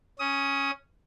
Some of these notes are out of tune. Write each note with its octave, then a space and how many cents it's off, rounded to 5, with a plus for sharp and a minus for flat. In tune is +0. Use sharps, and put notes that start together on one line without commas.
C#4 +0 D#6 +20